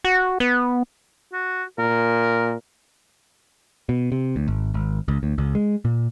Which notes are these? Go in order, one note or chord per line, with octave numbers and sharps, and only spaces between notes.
F#4
B3
F#4
A#2 A#4
B2
C3
D2
G#1
G#1
C#2
D2
C#2
G#3
A#2